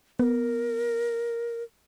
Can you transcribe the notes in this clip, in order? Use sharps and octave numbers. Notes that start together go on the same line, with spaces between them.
B3 A#4